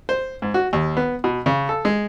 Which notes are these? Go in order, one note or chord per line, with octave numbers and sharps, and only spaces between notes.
C5
G#2
F#4
D#2
B3
B2
C#3
A4
G#3